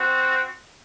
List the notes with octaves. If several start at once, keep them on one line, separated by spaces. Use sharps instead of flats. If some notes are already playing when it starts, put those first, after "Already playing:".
Already playing: C4 F#4